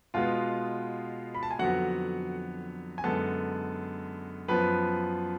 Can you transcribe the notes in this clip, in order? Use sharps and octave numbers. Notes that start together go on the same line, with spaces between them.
B2 G#3 B3 F4 F5
B5
A5
G#5
F2 D3 F#3 B3 F#4 F#5
G#5
F#2 D3 G#3 B3 A4 A5
F#2 F3 B3 B4 B5